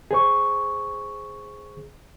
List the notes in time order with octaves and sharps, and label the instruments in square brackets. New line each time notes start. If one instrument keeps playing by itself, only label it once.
[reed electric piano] G#4 C5 C#6